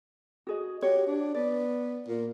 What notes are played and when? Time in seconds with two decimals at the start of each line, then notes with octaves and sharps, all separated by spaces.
0.47 F#4 G#4 D#5
0.82 F#4 G4 C#5
1.07 D4
1.35 B3 D5
2.08 A#2